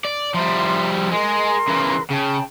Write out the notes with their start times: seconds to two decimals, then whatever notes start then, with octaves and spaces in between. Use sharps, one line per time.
0.05 D5
0.34 F3 G3 E5 A#5 C6
1.12 G#3 A#4 C6
1.68 C#3 E3
2.11 C#3 G5 A5